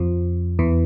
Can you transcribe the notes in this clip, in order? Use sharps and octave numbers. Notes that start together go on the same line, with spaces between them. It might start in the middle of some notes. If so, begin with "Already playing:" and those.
Already playing: F2 F3
E2 E3